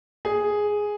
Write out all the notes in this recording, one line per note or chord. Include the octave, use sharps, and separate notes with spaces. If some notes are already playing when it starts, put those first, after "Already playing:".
G#4